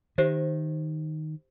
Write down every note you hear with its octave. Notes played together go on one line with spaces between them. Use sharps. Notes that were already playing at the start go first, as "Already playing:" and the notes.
D#3 G4 C5 E5